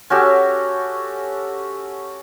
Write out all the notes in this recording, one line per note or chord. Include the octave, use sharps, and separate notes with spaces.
C#4 F#4 G4 A4